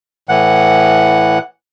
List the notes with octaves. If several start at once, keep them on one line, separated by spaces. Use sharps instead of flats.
A2 E3 F#5